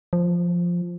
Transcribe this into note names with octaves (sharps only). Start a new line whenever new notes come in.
F3